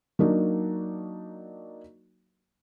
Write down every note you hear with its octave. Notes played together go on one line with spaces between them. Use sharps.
F#3 A#3 D4 D#4 F#4